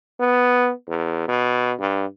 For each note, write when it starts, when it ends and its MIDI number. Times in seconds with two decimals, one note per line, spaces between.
0.20 0.71 59
0.88 1.26 40
1.28 1.72 47
1.80 2.05 43